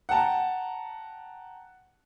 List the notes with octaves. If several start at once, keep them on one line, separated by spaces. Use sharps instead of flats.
F#5 G5 A5 A#5